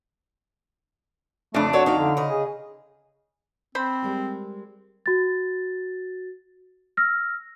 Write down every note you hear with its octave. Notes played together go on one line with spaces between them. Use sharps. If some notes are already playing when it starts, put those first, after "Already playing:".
F2 C#3 A3 D4
F#4 A4 C#5 D5
D#4 F5
D3
C#3 D#5
G#4
C4 C5 B5
G3 G#3 A#4
F#4 A6
E6 F6 A#6